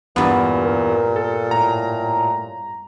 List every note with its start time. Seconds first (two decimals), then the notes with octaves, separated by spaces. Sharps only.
0.16 E2 G2 A#2 B3
0.64 A#4
1.16 A4
1.51 A2 A#5